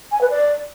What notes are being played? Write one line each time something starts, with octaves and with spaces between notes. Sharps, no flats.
G#5
B4
D5